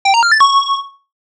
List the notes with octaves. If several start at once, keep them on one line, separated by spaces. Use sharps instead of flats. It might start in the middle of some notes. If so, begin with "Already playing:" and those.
G5
A#5
F6
A6
C#6